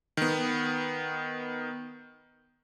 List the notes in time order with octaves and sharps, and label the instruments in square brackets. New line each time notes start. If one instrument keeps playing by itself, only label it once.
[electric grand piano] D#3 B3